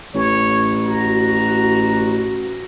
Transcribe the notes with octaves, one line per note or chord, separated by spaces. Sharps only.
A1 C#5
F#4 A#5